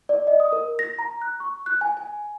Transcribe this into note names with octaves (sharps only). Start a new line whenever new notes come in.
D5
D#5
D#6
A#4
A#6
A#5
F#6
C#6
F#6
G#5
G#5